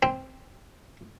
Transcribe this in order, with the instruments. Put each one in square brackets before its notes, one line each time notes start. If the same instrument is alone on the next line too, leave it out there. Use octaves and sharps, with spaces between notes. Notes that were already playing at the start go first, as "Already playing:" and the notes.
[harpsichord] C4